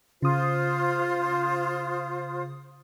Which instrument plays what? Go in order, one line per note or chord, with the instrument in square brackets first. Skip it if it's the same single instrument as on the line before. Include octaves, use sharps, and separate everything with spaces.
[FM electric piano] C#3 D#6 [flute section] F4 C5